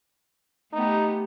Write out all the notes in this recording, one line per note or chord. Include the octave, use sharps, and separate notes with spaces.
A3 B3 D#4 G4